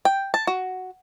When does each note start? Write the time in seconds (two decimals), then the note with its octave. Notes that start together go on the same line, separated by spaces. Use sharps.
0.05 G5
0.34 A5
0.47 F#4